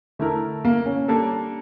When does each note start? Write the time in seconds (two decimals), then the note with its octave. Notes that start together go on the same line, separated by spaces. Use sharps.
0.19 D3 A3 E4 A#4
0.65 A#3
0.86 C#4
1.08 G3 A#3 D4 A4